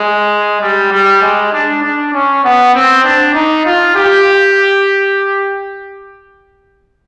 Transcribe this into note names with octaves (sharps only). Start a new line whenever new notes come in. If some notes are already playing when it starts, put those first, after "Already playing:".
Already playing: G#3
G3
G3
G#3
D4
D4
C#4
B3
C4
D4
D#4
F4
G4